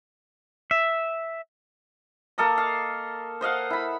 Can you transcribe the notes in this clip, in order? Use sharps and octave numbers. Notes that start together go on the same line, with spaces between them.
E5
A#3 A4 A#4 D#5
F5
C5 D#5 F5 F#5
E4 B5